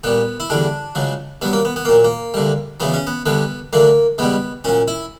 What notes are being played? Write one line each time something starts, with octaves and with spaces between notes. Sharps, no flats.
A#2 G3 B3
E4
E2 D3 G3 D4
C#2 C#3 F#3
G2 F#3 B3
A#3
B3
B3
A#2 F#3 A#3
A#3
D2 D3 G3
E2 C#3 F#3 B3
C#4
B3
D2 D3 G3 B3
D2 D3 F#3 A#3
C#2 B2 G3 B3
A#2 F#3 C#4
E4